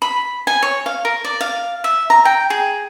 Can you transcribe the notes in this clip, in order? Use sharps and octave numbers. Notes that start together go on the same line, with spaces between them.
B5
G#5
C#5
F5
A#4
D5
F5
E5
A#5
G5
G#4